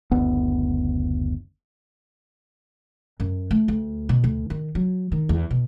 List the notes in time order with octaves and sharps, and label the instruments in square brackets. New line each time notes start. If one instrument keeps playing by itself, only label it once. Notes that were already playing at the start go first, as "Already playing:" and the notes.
[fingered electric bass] F#1 D2 B3
[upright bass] F#2
A3
D2
B2
D2
D#3
F#3
D#3
E2
B2